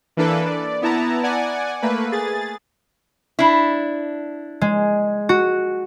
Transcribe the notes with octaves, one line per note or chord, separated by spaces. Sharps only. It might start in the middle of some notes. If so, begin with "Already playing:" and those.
E3 A#3 D4 A4 B4
D5
B3 E4 A5 A#5
D5 F#5 G#5
A3 A#3 B4
G#4 A6
D4 E4
G#3
F#4